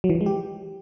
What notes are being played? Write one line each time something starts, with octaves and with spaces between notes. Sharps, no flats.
F#3
E3
F3
G#3
G4